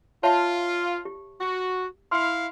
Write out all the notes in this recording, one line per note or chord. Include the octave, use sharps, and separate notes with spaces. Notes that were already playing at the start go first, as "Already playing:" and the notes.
F4 C#5 E5 A5
G4
F#4
E4 F5 C6